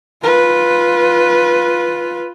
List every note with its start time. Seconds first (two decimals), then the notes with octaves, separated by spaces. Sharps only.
0.22 F4 B4